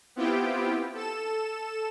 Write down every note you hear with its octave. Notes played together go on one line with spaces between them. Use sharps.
B3 C4 E4 F4 G4 G5
A4 E7